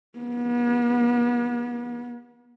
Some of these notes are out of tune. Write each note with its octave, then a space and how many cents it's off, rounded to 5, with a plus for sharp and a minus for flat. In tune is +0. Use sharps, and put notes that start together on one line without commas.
B3 -40